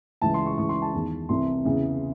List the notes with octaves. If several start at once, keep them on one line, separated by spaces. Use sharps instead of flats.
C#2 C#3 E3 A5
C6
C#6
C#2 C#3 E3 C#6
C6
A5
E2 D#3
C2 C3 E3 C6
E2 C#3 E3